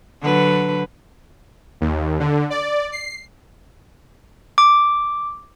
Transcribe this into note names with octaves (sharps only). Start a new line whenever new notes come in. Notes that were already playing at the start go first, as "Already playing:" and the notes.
D3 F#3 B4
D#2
D3
D5
C7
D6